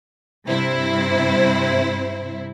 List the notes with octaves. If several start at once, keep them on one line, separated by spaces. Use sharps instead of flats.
G2 C3 E4 C5